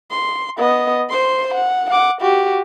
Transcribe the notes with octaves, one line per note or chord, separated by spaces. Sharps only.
C6
B3 D#5
C5 C6
F#5
F#5 D6
F#4 G4